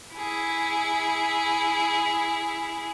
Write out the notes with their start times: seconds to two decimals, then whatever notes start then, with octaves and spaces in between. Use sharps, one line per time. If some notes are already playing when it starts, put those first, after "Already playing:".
0.14 E4 G#4